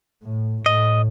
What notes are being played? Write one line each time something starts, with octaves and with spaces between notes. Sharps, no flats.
A2
A2 D#5